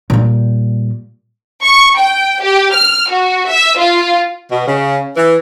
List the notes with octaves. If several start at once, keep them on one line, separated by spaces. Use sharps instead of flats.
A#2 G3
C#6
G5
G4
F6
F#4
E5
F4
B2
C#3
E3